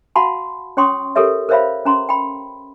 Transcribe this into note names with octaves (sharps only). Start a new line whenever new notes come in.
F#4 F5 F#5 A5 B5 C6
C#4 C#5 G5 C6 C#6 D#6
G4 A4 A#4 C#5 E5
A#4 C5 C#5 E5 F5 B5
C#4 A#5 C6
G5 B5